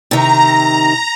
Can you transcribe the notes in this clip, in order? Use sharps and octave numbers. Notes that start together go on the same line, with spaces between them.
C3 D#3 A#5